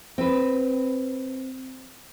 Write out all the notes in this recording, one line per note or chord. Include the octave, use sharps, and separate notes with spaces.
C4 B4